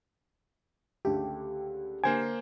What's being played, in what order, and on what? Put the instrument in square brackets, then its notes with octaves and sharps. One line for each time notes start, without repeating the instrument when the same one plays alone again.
[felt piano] C#2 D3 A3 [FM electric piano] G4
[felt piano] D3 [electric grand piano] A#3 C5 G#6 [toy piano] G#5